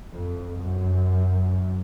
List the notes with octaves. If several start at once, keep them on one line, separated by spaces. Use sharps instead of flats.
F2
F#2